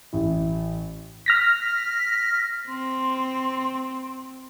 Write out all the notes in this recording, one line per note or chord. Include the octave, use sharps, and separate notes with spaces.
A1 E4
F6 A#6 B6
C4 C6